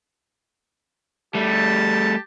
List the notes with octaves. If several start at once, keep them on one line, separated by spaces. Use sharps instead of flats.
G3 A3 G4 A5